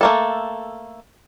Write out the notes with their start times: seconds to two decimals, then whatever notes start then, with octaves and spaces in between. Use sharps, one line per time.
0.01 A3 A#3 A4